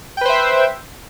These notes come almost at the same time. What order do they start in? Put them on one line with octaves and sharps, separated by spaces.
G5 B4 C5 E5